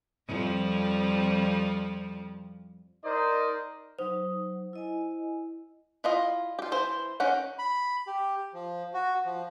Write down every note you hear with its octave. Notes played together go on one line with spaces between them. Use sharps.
F2 F3 G3
D#4 A#4 C5 D5 D#5
F#3 D#4 C5 D#6
E4 D#5 G#5
E4 F4 D#5
F4 G4
E3 C5
D#3 C#4 G4 F#5
B5
G4
F3
F#4
F3